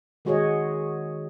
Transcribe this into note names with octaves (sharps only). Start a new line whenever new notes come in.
D#3 G#3 F#4 G#4 C#5 D#5